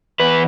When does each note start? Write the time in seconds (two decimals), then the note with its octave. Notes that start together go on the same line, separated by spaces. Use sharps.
0.20 E2 B4